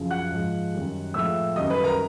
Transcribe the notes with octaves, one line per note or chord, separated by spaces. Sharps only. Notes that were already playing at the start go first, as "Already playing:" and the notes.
Already playing: F#2 C#3 F3
F#5 F#6
G#2 F3 G#3
F#2 D#3 G3
A2 F3 G#3 E5 E6
F#2 D#3 G3 D#5 D#6
B4 B5
A#4 A#5